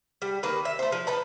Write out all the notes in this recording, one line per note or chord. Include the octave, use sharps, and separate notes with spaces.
G3
D#3 A#3 B4
E5
A3 C5
F3
D#4 B4 A5